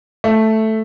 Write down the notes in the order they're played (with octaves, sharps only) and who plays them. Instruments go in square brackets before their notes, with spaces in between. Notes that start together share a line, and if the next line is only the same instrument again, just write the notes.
[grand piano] A3